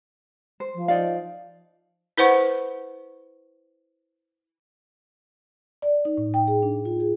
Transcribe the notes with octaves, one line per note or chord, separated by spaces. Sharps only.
C5
F3
D#4 D5 F5
E4 B4 C5 F#5 C#6
D5
D#4
A2
G5
G#4
D4
F4
G#4